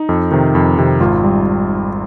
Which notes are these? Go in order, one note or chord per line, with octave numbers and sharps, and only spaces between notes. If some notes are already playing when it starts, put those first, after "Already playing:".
Already playing: D#4
F2
C3 D#3
F2
C3 D#3
G#1 F4
G3